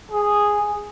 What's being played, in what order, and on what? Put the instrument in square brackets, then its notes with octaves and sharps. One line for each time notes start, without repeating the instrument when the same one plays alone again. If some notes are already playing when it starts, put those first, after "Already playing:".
[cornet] G#4